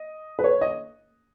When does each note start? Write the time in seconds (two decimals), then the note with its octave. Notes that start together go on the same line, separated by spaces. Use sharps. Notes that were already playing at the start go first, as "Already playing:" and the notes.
Already playing: D#5
0.39 B4
0.44 C#5
0.61 D#5